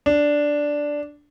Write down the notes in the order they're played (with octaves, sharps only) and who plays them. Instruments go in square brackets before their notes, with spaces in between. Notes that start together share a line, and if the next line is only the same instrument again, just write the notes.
[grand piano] D4